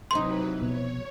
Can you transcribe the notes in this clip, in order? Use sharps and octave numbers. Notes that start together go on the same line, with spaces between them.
C3 E3 F#3 C4 D#4 B4 C6
B2 F3 C#5